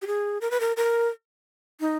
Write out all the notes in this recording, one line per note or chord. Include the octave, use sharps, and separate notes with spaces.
G4
G#4
A#4
B4
A#4
A#4
D#4